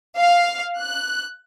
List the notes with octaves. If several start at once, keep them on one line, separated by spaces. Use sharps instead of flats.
F5
F#6